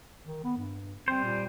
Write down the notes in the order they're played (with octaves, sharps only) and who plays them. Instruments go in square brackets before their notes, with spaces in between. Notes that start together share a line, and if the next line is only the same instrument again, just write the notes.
[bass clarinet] D#3
B3
G2
[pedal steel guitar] G3 C5 [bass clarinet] C4
[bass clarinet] A#2